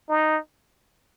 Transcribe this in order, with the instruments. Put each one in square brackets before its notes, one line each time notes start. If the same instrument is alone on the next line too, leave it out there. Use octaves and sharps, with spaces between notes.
[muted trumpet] D#4